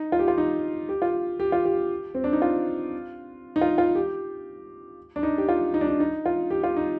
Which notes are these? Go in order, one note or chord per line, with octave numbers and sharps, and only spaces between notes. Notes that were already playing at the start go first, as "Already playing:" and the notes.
Already playing: D#4
F4
G4
F4
D#4
G4
F4
G4
F4
G4
C4
D4
D#4
F4
D#4
F4
F4
G4
D4
D#4
G4
F4
D#4
D4
D#4
D#4
F4
G4
F4
D#4